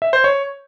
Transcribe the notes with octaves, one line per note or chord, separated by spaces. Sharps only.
E5
C5
C#5